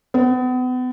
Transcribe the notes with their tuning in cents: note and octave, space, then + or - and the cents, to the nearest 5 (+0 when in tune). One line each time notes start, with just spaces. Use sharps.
B3 +35